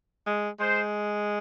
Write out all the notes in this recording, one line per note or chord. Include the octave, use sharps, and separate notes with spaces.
G#3
G#3 C5